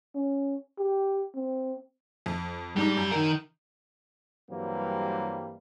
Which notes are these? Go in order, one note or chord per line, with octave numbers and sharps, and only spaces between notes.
C#4
G4
C4
F2
G#2 G3 D4 D#4
F#2
D#3 A#4
G2 E3 F#3 G3 A#3 C4